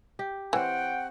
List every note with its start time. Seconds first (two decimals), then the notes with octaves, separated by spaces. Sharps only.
0.19 G4
0.53 E3 C4 C#5 F#5 G5